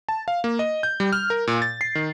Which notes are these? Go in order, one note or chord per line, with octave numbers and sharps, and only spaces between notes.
A5
F5
A#3
D#5
G6
G3
F6
A#4
A#2
A6
C7
D#3